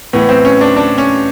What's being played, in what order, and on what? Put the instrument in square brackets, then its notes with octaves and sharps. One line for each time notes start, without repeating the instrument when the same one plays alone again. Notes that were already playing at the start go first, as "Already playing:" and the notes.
[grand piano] A2 E3 B3
C4
C#4
D4
D4
C#4